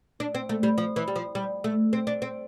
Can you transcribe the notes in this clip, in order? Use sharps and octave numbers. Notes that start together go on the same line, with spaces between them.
D4
C4
A3
G3
F3
E3
G3
F3
G3
A3
C4
D4
C4